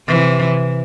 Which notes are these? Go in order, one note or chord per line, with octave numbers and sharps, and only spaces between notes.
C3 E3